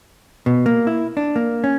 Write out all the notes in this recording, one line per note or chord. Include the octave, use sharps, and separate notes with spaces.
B2
A#3
E4
D4
A#3
C#4